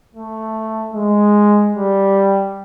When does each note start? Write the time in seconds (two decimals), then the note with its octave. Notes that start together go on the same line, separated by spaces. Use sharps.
0.15 A3
0.94 G#3
1.73 G3